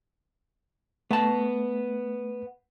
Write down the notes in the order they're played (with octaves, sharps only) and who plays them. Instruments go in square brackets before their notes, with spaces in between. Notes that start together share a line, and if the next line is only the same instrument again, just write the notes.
[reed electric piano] A3 [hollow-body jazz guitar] B3 A5